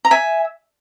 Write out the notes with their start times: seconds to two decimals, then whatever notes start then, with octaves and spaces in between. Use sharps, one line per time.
0.05 A#5
0.11 E5 G#5